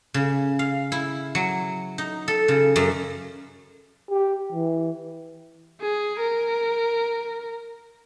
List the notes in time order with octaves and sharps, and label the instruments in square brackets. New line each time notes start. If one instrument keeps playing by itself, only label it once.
[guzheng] C#3
F5
E4
F#3
D#4
A4
C#3
F#2
[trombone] G4
E3
[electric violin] G#4
A#4